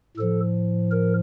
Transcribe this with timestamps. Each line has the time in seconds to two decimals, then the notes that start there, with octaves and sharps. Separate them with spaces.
0.17 A2 F3 A4
0.92 A#4